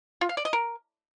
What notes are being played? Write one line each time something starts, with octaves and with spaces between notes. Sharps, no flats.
F4
F5
D5
D#5
A#4